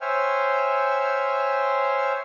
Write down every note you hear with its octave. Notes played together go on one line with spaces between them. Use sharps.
C5 C#5 E5 G5 G#5 F6